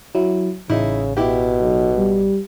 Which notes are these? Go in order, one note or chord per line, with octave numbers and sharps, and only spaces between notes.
F#3 E4
A1 C#3 D#4 E4
B2 E4 G4
B1
G3